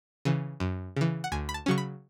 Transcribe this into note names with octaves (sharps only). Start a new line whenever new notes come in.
C#3 E3
F#2
C#3 E3
F#5
D2 G#5
B5
A5
C#3 F#3 C#4 C#6
B5